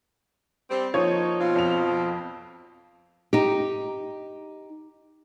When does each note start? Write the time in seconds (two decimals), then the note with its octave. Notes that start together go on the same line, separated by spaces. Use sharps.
0.70 G3 C4
0.94 F3 A#3 D#4 C#5 G#6
1.40 B2 C4 F4
1.56 F2 F7
3.33 D#4 G4